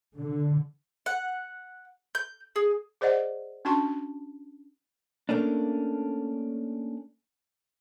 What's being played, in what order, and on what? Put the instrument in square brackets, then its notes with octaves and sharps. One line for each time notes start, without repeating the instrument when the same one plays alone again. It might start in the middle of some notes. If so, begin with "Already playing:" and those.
[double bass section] D3
[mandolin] F#5
G6
G#4
[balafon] G#4 C5 D5 D#5 F#5
C#4 D4 F#4 A5 C6 C#6
[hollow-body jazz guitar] A3 A#3 C#4 D4